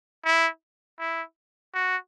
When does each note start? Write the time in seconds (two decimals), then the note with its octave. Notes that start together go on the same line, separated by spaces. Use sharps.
0.25 E4
0.99 E4
1.74 F#4